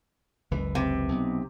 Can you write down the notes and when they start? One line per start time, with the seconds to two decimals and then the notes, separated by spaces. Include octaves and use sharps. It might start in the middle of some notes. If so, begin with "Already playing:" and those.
0.51 F#1 C#2 E3
0.75 C3
1.09 B1